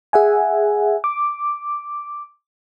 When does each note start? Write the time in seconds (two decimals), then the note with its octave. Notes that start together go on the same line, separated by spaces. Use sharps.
0.13 G#4 E5 F#5 G#5
1.04 D6